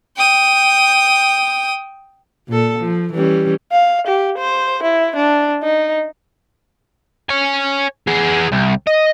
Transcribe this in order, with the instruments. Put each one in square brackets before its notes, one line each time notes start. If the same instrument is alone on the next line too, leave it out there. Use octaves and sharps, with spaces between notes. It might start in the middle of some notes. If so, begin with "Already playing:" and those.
[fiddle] G5 D#6
[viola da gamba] A#2 A4
F3
E3 G3 C#4
[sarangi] F5
G4
C5
E4
D4
D#4
[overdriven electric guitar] C#5 G#5
B3 G#4
C2
D#5